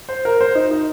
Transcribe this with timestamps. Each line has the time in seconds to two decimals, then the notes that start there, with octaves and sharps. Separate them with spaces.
0.09 C5
0.25 A#4
0.41 C5
0.55 D#4
0.71 D#4